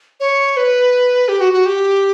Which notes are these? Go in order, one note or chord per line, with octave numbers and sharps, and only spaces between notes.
C#5
B4
G4
F#4
F#4
G4